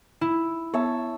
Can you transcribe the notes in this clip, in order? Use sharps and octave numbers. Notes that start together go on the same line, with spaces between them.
E4
B3 C#5 E5 A5